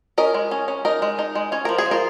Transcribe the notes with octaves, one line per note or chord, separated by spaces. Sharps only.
C#4 A#4 D#5
G#3
C#4
C#4
D#4 A#4 D#5
G#3
D#4
G#3
C#4 C#5
F3 A#4
G#4
F3
F4 A#4